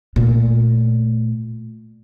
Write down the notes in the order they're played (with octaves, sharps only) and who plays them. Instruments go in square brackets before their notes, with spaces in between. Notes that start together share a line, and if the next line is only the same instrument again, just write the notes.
[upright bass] A#2 A3